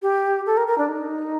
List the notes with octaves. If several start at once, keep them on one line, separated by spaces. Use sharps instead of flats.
G4
A4
A#4
A#4
D4
D#4